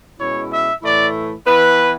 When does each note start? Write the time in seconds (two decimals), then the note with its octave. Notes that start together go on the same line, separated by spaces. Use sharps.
0.19 B2 G#3 C#4 E4 C#5
0.52 E5
0.82 A2 E3 A3 E4 D5
1.46 E3 B3 E4 B4